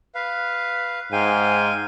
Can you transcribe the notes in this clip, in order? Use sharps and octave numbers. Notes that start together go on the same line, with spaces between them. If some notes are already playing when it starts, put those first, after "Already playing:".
B4 F5
G#2 F5 G5 G#5